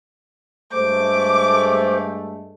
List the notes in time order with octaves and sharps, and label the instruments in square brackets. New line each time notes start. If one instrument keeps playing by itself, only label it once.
[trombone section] G2 G#3 A3 [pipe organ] C5 [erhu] D6